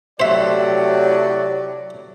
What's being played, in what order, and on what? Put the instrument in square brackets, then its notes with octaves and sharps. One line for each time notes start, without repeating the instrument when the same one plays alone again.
[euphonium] A2 [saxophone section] C3 F#3 [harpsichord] C5 E5 [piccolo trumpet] D5